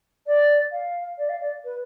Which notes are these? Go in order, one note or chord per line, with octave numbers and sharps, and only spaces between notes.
D5
F5
D5
F5
D5
B4